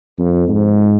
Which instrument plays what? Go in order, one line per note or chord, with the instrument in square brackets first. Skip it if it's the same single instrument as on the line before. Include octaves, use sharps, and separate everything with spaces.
[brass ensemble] F2
G#2